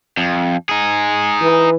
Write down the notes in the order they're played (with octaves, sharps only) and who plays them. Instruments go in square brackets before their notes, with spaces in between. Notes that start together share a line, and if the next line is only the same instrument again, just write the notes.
[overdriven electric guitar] F2
D#4 G#4
[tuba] E3